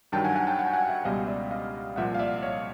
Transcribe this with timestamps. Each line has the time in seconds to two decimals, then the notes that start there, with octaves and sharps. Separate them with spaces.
0.12 G2 D#3 F#3 G5 A5
0.24 F#5 G#5
0.36 F#5 G#5
0.47 G5 A5
0.59 F#5 G#5
0.73 F#5 G#5
0.89 E5 F#5
1.05 C#2 B2 G3 D#5 F5
1.27 D5 E5
1.51 D#5 F5
1.96 C2 A#2 F3 E5 F#5
2.15 F5
2.19 D5 E5
2.43 C#5 D#5